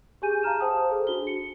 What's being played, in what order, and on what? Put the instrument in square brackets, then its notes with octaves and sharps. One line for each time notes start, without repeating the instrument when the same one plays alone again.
[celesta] G4 G#4 G#5 G6 D#7
F5 A5 A#5 F6 E7
C5 F5 G5 A5 D#6
G#4 A4 C5
D4 F#4 G7
C#7